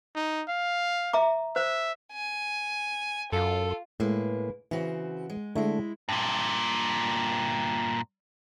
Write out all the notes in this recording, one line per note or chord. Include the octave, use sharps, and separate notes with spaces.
D#4
F5
E5 A#5 D6
C5 E5
G#5
F#2 F4 A4
A2 G#3 A#3 B4
C#3 E3 C4 F#4
G#3
D3 G#3 A3 E4
G2 A#2